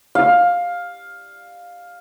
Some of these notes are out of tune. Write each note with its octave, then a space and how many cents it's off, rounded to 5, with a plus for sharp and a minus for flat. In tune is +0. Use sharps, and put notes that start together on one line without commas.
F5 +10